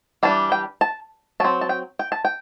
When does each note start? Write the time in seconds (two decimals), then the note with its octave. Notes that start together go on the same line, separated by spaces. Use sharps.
0.23 E3 G3 D4 A5
0.52 G5
0.81 A5
1.40 F#3 C4 A5
1.61 A5
1.69 G5
1.99 G5
2.12 A5
2.25 G5